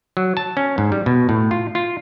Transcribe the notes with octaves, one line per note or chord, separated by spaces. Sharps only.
F#3
A5
C#4
G#2
G3
B2
A2
F4
F4